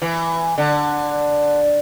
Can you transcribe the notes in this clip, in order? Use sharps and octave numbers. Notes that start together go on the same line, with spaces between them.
E3
D3